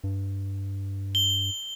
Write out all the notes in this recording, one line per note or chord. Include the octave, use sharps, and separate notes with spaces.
G2
G7